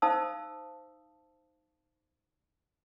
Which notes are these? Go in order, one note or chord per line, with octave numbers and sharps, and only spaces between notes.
D#4 C5 F5 A5 D#6 E6